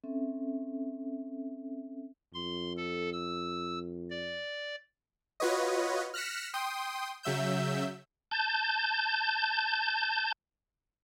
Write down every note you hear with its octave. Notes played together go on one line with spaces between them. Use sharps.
C4 C#4 A4 E5
F2 C6
A4
E6
D5
F4 F#4 B4 C#5 D#5
F6 F#6 A#6 B6 C#7 E7
G5 C6 D#6
C#3 F#3 E5 E6 G6
A5 G6